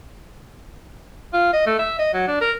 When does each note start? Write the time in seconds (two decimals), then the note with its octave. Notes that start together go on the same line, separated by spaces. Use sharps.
1.33 F4
1.53 D#5
1.66 A3
1.79 E5
1.99 D#5
2.14 F#3
2.27 D4
2.41 A#4